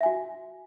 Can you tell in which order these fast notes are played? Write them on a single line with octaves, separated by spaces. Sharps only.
E5 G#5 F#4